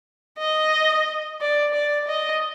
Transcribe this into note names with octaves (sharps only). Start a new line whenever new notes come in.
D#5
D5
D5
D#5